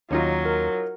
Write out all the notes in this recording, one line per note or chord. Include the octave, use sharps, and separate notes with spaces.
D#2 F#3 C#4 D#4 F4
A#4